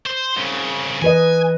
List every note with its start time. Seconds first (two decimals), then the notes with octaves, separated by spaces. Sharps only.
0.06 C5
0.37 C2 C#3
1.02 E3 B4 D#5 G#5